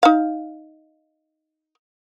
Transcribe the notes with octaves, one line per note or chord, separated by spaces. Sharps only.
D#4 F5